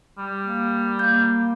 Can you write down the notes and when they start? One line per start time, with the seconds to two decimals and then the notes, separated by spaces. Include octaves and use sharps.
0.18 G3
0.44 A#3
0.99 A#3 G6